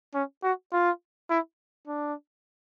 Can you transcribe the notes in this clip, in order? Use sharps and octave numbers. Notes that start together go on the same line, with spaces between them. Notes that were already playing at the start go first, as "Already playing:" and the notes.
C#4
F#4
F4
E4
D4